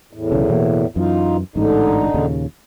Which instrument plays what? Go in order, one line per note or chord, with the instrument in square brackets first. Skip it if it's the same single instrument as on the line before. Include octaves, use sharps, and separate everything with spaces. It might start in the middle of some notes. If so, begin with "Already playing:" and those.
[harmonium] E2 A2
[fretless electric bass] B1 C#3
B2 E3 A#3
[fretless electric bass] F#2 E3 [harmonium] D#4 F4
[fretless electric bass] A1 G#2 [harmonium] D3 D#4
[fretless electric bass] D#2 A#2 C#3